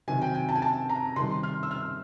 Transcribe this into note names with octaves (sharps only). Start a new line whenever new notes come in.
C3 D#3 F#3 G#5
G5
G#5
A5
G#5
A5
A#5
C3 D#3 G3 C6
F6
E6
F6